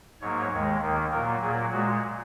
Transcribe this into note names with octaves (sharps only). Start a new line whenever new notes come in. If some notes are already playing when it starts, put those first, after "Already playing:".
G#2 F#3 A#3 C#5
D#2 D#3 G#3
D#2 D#3 A#3
A#2 F#3 A#3 A#4
A#2 F#3 A#3 G#4
A#2 G#3 F#4